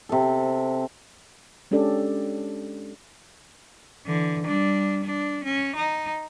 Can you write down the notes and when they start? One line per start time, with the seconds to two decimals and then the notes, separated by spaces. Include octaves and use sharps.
0.09 C3 A4
1.71 G#3 C#4 D4 G4 A4 D5
4.06 D3 E3
4.46 G3 D4
5.04 D4
5.44 C#4
5.76 D#4